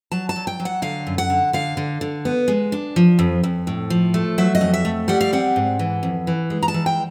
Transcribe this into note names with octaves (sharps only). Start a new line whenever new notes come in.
F#3 A5
A5
F#3
G5
F#3
F#5
D3 F5
F#2
F#5
D3
D3 F5
D3
D3
B3
G#3
D4
F3
F2
F2
A2
F3
A3
F#3 E5
D#5
F2
E5
A3
G3 F#5
F5
C4 F#5
G#2
E3
F2
E3
G#3
A#5
A5
E3
G5